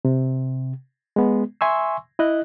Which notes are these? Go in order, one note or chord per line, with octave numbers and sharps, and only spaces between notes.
C3
G#3 B3
E5 G#5 C6 C#6 E6
E4 D#5 F#6